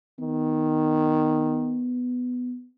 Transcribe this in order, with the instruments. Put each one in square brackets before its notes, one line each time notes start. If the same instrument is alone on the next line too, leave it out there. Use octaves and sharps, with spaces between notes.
[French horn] D#3 [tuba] B3